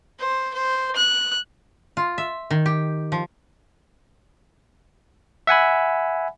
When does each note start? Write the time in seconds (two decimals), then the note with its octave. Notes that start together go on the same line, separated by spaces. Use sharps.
0.19 C5
0.54 C5
0.96 F#6
1.97 F4
2.18 E5
2.51 D#3
2.66 G4
3.12 F3
5.47 E5 F#5 G#5 B5